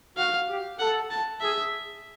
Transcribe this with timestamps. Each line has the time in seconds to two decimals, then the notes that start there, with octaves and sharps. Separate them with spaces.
0.17 F#4 F5
0.48 G4
0.79 A4 F#5
1.11 A5
1.41 G#4 E5